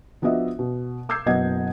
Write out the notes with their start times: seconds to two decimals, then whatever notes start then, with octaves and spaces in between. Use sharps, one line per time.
0.22 F3 B3 D4 F#4 D#5 E5
0.59 B2
1.09 D6 E6 G6 G#6 C7
1.26 F#1 B2 B3 D#5 F#5 G#6